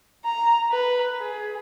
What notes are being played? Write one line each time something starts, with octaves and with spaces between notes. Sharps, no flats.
A#5
B4
G#4